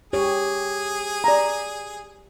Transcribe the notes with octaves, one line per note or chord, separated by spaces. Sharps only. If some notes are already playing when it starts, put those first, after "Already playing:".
G4 G#4 C#5
D5 A#5